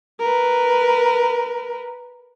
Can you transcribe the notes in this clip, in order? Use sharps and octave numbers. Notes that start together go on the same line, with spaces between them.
A#4 B4